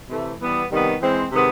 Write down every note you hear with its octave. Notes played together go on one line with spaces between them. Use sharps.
C3 E3 A3
E3 G3 B3
C3 D#3 G3 B3
E3 G#3 C4
C3 D#3 G#3 B3